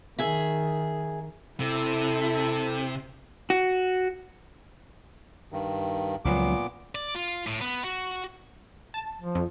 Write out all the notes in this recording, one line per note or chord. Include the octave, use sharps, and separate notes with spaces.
D#3 G#4 E5
C3 E4 A4
F#4
G2 D#3
C#2 A#2 F3 F#3 B3 D6
D5
F4
A2
B3
F#4
A5
F3
F2